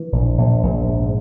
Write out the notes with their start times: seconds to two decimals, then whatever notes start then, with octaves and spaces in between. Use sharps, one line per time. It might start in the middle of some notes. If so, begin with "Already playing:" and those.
Already playing: E3
0.12 A#1
0.38 A#1
0.63 A#1
0.89 G#2